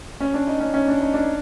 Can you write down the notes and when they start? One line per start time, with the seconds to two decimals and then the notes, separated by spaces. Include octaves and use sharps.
0.20 C#4
0.34 D4
0.47 D#4
0.60 C#4
0.74 C#4
0.88 D4
1.00 D#4
1.14 D4